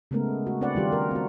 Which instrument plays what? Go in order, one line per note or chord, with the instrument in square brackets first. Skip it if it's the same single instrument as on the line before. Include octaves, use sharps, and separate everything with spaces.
[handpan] C#3 G#3 A3 B3 A#4
F#4
C4 D4 B4 D5 F#5
D#3 G3 F4 G4
A#4
C4 F#4